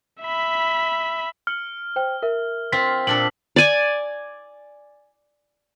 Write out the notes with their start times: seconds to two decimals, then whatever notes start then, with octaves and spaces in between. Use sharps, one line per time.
0.22 E5 B5
1.47 F6 C#7 F#7
1.96 C5 G5
2.23 A#4 E5
2.72 C4 F4 B6
3.07 A#2 D4 A4 F#7
3.56 D5 G#5